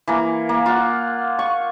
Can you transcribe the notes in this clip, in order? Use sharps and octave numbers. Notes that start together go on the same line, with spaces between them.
E3 A#3
A#3
F4 F#5
C#6